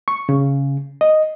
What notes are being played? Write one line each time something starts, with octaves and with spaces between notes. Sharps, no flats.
C#6
C#3
D#5